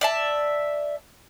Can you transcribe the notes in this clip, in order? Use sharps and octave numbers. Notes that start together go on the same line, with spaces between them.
D5 E5 A5